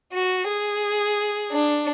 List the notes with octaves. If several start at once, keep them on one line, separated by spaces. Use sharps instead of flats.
F#4
G#4
D4